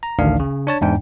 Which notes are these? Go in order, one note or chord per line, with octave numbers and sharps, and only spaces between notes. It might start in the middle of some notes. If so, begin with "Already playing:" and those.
A#5
A1 D2 D#3 D4 F5
C#3
D4 C#5 A5
E2 G#2 D4 G5